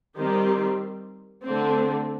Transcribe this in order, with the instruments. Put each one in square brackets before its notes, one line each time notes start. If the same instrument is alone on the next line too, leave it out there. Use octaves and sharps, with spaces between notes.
[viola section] D#3 G3 C4 G4
D3 A3 C4